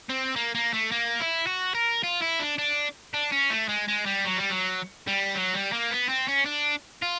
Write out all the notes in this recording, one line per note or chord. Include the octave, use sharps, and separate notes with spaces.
C4
A#3
A#3
A3
A#3
E4
F#4
A#4
F4
E4
D4
D4
D4
C#4
A3
G#3
G#3
G3
F#3
G3
F#3
G3
F#3
G3
A#3
B3
C4
C#4
D4
F4